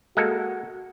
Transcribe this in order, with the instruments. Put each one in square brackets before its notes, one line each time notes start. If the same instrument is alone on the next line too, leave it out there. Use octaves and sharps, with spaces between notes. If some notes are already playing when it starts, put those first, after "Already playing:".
[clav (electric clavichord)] G#3 A#3 A4 [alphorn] F#4